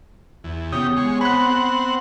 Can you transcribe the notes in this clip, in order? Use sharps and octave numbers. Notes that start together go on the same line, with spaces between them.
E2
C#3 B3 G4 D#6
G#3 C#5
C4 F#5 B5 F#6